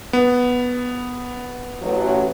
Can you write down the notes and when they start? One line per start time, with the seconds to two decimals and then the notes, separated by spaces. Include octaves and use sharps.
0.13 B3
1.82 A1 F#3